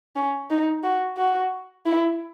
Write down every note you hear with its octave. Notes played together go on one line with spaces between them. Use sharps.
C#4
D#4
F#4
F#4
E4